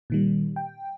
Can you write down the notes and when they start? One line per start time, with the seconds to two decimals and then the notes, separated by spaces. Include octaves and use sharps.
0.10 A#2 D#3 G3
0.56 G5